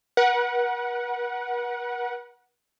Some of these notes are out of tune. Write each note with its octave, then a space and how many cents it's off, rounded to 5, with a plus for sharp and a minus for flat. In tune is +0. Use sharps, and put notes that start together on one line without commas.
B4 -45 F#5 +0